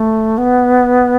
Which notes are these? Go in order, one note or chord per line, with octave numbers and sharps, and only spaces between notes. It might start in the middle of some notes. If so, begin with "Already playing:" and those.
Already playing: A3
B3